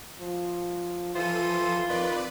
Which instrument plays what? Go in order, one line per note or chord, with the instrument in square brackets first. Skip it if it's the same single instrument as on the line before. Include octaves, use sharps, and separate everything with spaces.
[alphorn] F3
[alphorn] E3 [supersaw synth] F3 A4 D#7 [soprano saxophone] F4 [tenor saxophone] C5
[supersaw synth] F2 B4 D5 [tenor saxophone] D#3